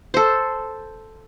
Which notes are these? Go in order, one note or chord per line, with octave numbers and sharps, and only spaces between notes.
A4 C5